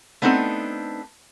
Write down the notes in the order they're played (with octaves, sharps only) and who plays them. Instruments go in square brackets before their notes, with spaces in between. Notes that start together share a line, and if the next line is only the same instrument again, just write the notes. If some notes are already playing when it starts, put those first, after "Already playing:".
[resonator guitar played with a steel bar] A3 B3 C4 D4 D#4 A4